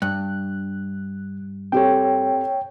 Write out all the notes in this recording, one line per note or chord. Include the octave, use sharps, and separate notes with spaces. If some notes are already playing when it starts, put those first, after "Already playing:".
G2 F#6
C4 G4 A4 C#5 G5